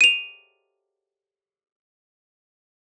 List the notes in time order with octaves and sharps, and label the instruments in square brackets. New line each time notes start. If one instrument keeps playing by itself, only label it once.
[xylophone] D#7 F7